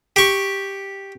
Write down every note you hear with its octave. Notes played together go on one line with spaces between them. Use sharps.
G4 C#6